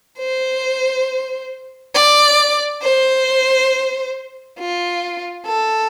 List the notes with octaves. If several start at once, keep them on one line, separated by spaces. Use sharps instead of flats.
C5
D5
C5
F4
A4